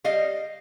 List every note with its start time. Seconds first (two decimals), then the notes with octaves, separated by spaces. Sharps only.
0.04 G3 D#5 F5